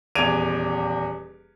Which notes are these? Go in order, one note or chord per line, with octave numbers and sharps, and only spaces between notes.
D#1 E2 G#6 D7 D#7 F7